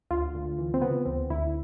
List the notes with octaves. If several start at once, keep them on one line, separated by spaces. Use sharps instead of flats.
D2 F4
D2
E3
C4
C#3 B3
D2 C4
D2 E4